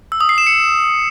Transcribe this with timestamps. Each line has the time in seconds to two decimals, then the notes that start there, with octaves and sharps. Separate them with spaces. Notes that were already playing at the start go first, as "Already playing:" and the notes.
0.12 E6
0.21 D#6
0.29 C7
0.38 E7
0.47 C#7